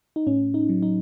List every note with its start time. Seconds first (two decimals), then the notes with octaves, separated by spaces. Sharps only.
0.16 D#4
0.27 A2 C#4
0.54 D#4
0.69 F#3
0.82 D#4